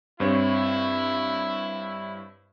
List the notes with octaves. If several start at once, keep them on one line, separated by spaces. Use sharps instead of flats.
G2 C4 E4 C#5